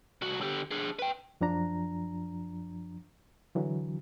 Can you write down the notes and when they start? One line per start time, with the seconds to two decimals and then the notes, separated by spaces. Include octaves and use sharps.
0.22 C2 F#4
0.41 D3 G4
0.71 D4 G#4
0.99 B4 G5
1.41 F#2 F3 D4 A#5
3.55 D3 E3 F#3